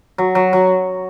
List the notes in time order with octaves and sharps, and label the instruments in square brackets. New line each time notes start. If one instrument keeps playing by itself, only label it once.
[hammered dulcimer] F#3
F#3
F#3